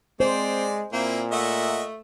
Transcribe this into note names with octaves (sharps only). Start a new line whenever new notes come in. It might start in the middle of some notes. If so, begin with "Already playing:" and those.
G#3 C4 C5 D5
A#2 A#3 C4 E4
A3 D#5 E5 F#5